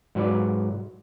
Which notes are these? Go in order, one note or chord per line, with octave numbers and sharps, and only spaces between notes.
G#2 F#3 B4 D5